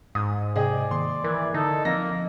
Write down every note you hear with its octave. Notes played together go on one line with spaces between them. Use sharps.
G#2 D#6
C3 G#4 D5 D#5 G5 D#6
D#3 A#3 C6
E3 A#4 G#6
D3 D#4 A4
F3 A#3 C4 D#5 A#6